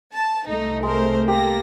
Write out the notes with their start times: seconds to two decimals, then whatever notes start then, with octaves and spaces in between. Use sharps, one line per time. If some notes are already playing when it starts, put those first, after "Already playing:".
0.13 A5
0.47 C2 A3 D#4
0.83 G#3 A#4 C5
1.28 A#3 G4 A4 A#6